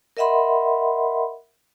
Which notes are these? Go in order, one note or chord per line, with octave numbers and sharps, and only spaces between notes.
A#4 D#5 E5 F#5 B5 C6